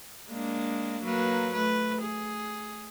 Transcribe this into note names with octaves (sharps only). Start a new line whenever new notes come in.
G#3 A#3 D4
F#3 A#3 B4
A3 B4
G#4